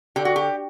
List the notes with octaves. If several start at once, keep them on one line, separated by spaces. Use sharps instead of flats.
D3 G4
F#4
G4